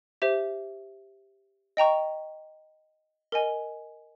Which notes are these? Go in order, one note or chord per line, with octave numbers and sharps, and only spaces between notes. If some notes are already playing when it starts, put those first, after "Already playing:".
G4 C5 E5
D#5 G5 A#5 C#6
A#4 D#5 G#5